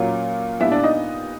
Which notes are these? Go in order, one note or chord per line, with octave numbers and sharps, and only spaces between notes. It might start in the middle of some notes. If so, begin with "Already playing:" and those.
Already playing: A#2 F#3 A#3 C#4 F4
A#2 G3 B3 D4 E4 F4 E5
D4 D5
D#4 D#5